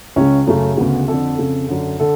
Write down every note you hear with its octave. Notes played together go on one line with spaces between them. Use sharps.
C#2 C#3 C#4
F#2 C#3 A3
D2 C#3 B3
F2 D3 A4
F2 C#3
F#2 D3
D3 A4